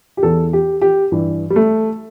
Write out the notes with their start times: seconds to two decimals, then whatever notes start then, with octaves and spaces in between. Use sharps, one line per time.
0.17 G4
0.23 E2 E3 A4
0.53 G4
0.82 G4
1.12 G2 E3
1.50 G3
1.56 A3